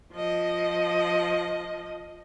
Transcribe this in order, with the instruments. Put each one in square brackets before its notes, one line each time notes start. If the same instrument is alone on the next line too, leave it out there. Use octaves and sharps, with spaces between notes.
[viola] F3 D#5